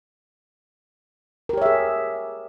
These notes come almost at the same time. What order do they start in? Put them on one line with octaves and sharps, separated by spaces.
A#4 G4 C#5 E5 G#4